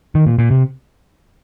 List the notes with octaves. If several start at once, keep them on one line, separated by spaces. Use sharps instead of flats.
D#3
A#2
A#2
C3